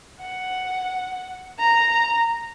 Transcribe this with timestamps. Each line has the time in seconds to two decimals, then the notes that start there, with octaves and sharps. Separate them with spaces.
0.21 F#5
1.59 A#5